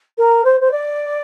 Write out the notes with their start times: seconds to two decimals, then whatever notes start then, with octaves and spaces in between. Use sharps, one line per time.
0.18 A#4
0.44 C5
0.60 C5
0.71 D5